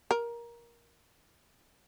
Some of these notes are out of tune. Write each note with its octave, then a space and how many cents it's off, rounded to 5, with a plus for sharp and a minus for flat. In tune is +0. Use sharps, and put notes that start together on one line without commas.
A#4 +15